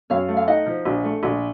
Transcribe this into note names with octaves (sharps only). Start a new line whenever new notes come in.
F#2 C#5 F5
A3
F5
D#4 D#5 F#5
F3
A#1
A3
A#1